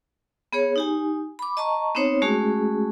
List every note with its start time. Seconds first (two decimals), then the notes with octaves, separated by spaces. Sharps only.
0.53 B3 G#4 C#5
0.76 D#4 G4 G#5
1.39 B5 D6
1.57 D#5 A5 A#5 C#6
1.95 B3 C4 D#4 C5 C#5
2.22 G#3 A3 C#4 F#4 G#4